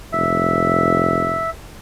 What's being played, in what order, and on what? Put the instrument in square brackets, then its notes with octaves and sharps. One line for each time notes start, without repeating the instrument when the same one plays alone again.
[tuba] F1 [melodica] E5